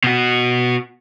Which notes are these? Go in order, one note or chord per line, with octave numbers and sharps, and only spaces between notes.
B2 F#4